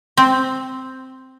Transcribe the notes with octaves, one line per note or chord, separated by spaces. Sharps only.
C4